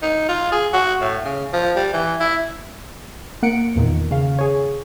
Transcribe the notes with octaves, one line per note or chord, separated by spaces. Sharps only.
D#4
F4
G#4
F#4
A2
C#3
F3
G3
E3
E4
A#3 F#5 C#7 D7
E2 A#2 D#3
C#3 F5
G#4 C#5